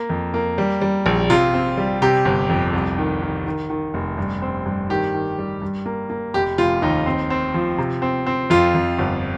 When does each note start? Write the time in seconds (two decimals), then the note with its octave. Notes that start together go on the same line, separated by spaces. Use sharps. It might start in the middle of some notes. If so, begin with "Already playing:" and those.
Already playing: A#3
0.09 F2
0.34 A#3
0.58 G3
0.81 G3
1.06 A#1
1.30 C3 F4
1.54 C4
1.77 G3
2.02 C3 G4
2.25 G1
2.49 F2
2.73 C2
2.98 D#3
3.22 D#3
3.46 D#3
3.70 D#3
3.94 F1
4.18 G2
4.42 C4
4.66 G2
4.90 D#3 G4
5.14 D#3
5.39 G3
5.62 G2
5.86 A#3
6.10 A#3
6.34 F1 G4
6.58 F1 F4
6.82 D#2 D#4
7.06 C4
7.30 C4
7.54 F3
7.78 C3
8.02 C4
8.26 C4
8.50 F2 F4
8.74 F2
8.98 G1